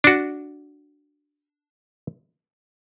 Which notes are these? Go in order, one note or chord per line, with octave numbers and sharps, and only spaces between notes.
D4 F#4